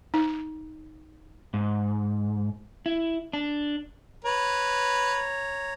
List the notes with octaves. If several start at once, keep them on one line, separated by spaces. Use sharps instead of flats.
D#4
G#2
E4
D4
B4 C#5 A#5